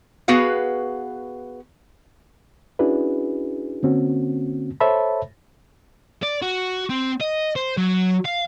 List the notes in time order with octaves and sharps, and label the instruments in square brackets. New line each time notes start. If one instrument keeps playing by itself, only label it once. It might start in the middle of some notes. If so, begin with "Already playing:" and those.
[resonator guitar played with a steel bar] B3 F#4 G#4 B4 F5
[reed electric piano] C#4 D4 E4 F#4 G#4 B4
D3 A#3 C4 C#4 F#4
A4 C5 C#5 E5 A5 B5
[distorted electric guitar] D5
F#4
C4
D#5
C5
F#3
F5